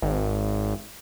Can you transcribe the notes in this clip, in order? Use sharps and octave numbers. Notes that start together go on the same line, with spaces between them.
G#1